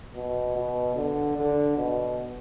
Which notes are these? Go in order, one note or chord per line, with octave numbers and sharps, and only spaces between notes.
B2
B2
D3
D3
B2